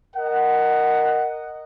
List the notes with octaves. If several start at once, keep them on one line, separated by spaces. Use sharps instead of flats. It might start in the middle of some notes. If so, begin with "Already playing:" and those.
A#4 D#5 F#5